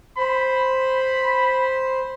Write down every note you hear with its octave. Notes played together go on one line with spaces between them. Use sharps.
C5 B5